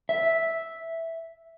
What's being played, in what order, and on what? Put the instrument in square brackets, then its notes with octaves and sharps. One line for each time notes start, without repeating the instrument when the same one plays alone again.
[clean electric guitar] E5